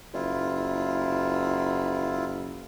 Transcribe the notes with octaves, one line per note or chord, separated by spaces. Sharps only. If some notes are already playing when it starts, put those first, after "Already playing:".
F#1 E4 F4